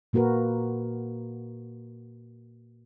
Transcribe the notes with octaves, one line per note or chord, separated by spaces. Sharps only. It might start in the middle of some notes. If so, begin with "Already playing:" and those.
A#2 A#3 F#4 A#4 B4